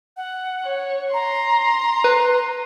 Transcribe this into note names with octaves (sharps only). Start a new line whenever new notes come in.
F#5
C#5
A#5 C6
B4